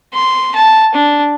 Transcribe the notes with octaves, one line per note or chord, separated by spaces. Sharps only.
C6
A5
D4